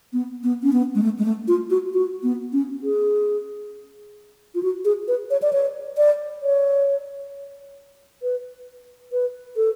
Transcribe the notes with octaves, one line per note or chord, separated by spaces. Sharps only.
B3
B3
C#4
B3
G#3
A3
G#3
A3
F4
F#4
F#4
B3
C#4
G#4
F4
F#4
G#4
B4
C#5
D5
C#5
D5
C#5
B4
B4
A4